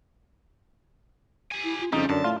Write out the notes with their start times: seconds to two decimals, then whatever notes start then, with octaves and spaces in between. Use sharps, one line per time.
1.51 G4 G#5
1.64 E4
1.81 F4
1.93 F2 C#3 G3 C4 D#4
2.10 F#2 D3 D5 A5
2.24 A2 F4